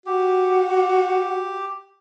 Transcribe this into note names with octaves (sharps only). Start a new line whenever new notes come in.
F#4 G4